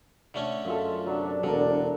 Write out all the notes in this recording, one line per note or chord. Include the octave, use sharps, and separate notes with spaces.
D3 A3 C#4
F#2 G#3 F4 A4 E5
C3 F#3 D4
E1 D3 A4 A#4